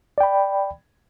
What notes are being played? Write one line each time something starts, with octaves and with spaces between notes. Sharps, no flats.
D5 G5 B5